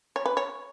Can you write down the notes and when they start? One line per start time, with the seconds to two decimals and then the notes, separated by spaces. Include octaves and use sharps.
0.16 C#5
0.26 B4
0.37 C#5